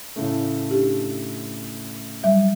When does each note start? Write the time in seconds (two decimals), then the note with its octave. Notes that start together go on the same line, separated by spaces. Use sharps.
0.16 A2 C#3 A3
0.71 D4 G4
2.23 F#3 G3 E5